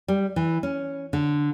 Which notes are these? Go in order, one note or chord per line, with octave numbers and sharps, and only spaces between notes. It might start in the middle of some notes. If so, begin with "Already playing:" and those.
G3
E3
C#4
D3